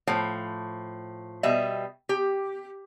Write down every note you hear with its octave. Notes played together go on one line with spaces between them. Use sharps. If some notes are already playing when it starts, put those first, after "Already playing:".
A2 F3
B2 G3 D#5 E5
G4